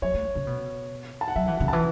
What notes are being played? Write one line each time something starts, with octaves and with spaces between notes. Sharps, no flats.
F#3 C#5
A3
C#3
B2
A5
F#5
F#3 E5
E3 F#5
F#5
C#3
A5
E3